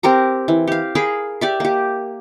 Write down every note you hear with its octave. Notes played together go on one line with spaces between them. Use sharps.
C4 G4 A#4 A#5
E3
G4 F5
G#4 A#4 F5 B5
G4 D5 E5
A#3 G4